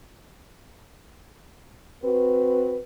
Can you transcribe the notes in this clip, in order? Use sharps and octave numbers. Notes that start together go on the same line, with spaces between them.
C4 F#4 B4